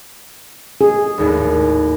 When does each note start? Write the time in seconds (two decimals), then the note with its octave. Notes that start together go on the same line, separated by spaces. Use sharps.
0.81 G#4
1.18 G#1 D#2 A2